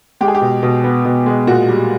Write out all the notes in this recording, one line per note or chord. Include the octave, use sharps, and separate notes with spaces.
G#3 G4
G#4
G4
B2
B2
B3
B2
G#3
A#2 F#4
G3